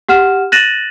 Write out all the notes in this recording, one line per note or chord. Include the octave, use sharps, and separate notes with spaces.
G4 F#5 F6 E7
F#6 A6 A#6 D#7 E7 F#7